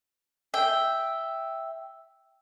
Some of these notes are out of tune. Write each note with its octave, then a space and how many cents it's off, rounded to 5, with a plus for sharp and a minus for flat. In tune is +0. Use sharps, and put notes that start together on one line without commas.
E5 +0 G5 +0